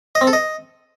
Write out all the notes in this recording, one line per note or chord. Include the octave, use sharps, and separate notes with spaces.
D#5
C4
A4
D#5